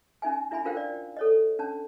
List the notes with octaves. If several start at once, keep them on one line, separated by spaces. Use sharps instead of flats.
C#4 D#4 E5 G#5
D4 E4 E5 G#5 B5
D4 F4 A#4 C5 F5 G5
D5
A4 C#5 D#5
C#4 D4 A5